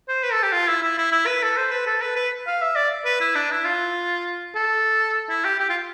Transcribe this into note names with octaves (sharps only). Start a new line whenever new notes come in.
C5
B4
A4
G4
F4
E4
E4
E4
E4
B4
A4
C5
B4
A4
B4
B4
F5
E5
D5
B4
E4
D4
E4
F4
A4
E4
G4
G4
F4